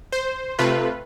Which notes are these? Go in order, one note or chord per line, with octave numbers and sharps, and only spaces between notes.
C5
C3 A3 F4 B4